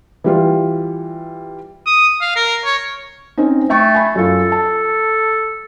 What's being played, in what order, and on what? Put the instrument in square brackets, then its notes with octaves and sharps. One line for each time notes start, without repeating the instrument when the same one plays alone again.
[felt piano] E3 G3 F4
[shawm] D#6
F5
A#4
C#5
[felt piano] C4 C#4 D#4
[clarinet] A3 [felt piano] E5 G5 C#6
[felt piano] G#5 B5
[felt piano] F#2 F4 [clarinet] A4
[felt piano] A5